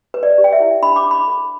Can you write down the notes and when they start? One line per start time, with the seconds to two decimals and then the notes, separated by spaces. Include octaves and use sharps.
0.14 B4
0.23 D5
0.38 G4
0.44 G5
0.53 E5
0.60 E4
0.82 D4 B5
0.96 D6
1.06 D4
1.11 B5
1.28 A4